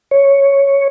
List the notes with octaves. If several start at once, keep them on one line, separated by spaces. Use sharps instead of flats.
C#5